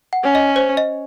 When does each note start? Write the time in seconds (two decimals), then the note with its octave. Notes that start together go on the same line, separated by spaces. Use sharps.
0.13 F#5
0.23 C#4
0.35 D#5
0.56 C5
0.77 D#5